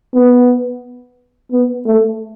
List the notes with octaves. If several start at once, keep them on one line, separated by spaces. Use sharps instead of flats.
B3
B3
A3